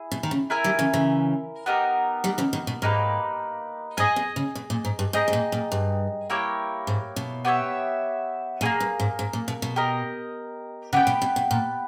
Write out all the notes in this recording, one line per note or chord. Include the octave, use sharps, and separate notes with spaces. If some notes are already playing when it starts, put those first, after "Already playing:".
Already playing: E4 G#4
B2
D#3
C#3
E4 A#4 E5 G#5
D#3 G3
C#3 E3
C#3 E3
B3 D#4 G4 A#4
D#3 G3
C#3 E3
B2 D#3
B2
G#2 A#3 D#4 G4 B4
G#2 G#4 D#5 G#5
B2
C#3
B2
A#2
G#2
G2
G#2 D#4 G#4 D#5 G5
G#2
A#2
A#2
G2
A#3 E4 G4 C#5
G#2
B2
B3 G4 C#5 E5
A#2 A#3 C#4 G#4
G2
G#2
G#2
A#2
B2
B2
G4 A#4 D#5
C#3 B3 G4 B4 G5
B2
B2
B2
A#2